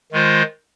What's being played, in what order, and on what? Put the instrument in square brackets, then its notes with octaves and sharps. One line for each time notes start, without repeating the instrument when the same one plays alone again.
[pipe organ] D#3 G#3 F4 C5